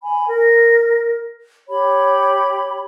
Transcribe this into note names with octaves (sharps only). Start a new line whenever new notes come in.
G#5 B5
A#4
G4 C#5 B5